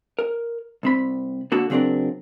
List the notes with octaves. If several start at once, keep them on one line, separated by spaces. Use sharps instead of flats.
A#4
C2 C4 B5
D3 A#3 F#4 A4
C#3 F#3 C4 D4 A#4